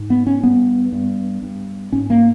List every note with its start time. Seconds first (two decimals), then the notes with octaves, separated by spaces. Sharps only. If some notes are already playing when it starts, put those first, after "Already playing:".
Already playing: G#2
0.10 B3
0.27 C#4
0.43 G2 B3
0.93 G2
1.43 G2
1.92 G#2 C#4
2.10 A#3